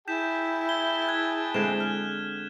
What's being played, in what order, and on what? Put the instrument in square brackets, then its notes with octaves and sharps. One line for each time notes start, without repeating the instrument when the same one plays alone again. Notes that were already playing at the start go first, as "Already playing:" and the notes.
[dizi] E4 [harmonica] G#4 G5 A5 [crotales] G6 B6 E7
[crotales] G7
F#6 G#6
[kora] D3 G#3 C4 [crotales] E7
[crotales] F6